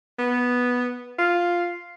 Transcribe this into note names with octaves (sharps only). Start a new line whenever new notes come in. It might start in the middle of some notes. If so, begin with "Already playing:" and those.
B3
F4